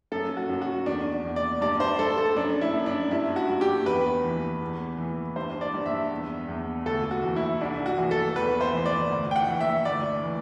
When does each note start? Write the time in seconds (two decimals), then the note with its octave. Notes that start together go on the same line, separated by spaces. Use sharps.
0.12 F#2 A4
0.37 F#4
0.49 F#2
0.62 F#4
0.86 E2 D4
1.24 E2
1.36 D5
1.61 G2 D5
1.80 C5
1.99 G2 A4
2.18 A4
2.36 F#2 D4
2.61 E4
2.73 F#2
2.86 D4
3.11 G2 E4
3.36 F#4
3.49 G2
3.61 G4
3.86 E2 B4
4.24 E3
4.61 E2
4.98 E3
5.36 G2 C5
5.61 D5
5.73 G2
5.86 E5
6.11 E2
6.48 E2
6.86 D2 A4
7.11 F#4
7.23 E3
7.36 E4
7.61 C2 D4
7.86 F#4
7.98 E3
8.11 A4
8.36 E2 B4
8.61 C5
8.73 E3
8.86 D5
9.10 D2
9.31 G5
9.36 F#5
9.48 E3
9.60 E5
9.85 D2 D5
10.23 E3